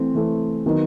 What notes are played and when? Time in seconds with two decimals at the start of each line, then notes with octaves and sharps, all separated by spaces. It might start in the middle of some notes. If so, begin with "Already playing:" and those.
Already playing: E3 A3 C4
0.15 E3 A3 C4
0.66 D#3 F#3 B3 D#4